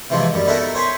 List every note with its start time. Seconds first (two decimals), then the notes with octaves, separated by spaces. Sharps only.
0.10 C3 E3 F3 G#3 C#4
0.33 F#2 G3
0.47 B3 D#4 E4 F#4 A4 A#4
0.75 C5 C#5 G#5 B5 C6